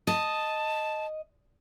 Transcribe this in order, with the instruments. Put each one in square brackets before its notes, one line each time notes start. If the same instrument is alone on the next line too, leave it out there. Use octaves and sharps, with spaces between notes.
[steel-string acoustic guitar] D#5 [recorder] A5